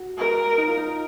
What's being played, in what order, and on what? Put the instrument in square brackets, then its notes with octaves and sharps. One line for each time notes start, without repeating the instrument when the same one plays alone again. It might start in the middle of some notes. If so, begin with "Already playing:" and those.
Already playing: [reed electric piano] F#4
[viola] A#4
[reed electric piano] D#4
F4
D#4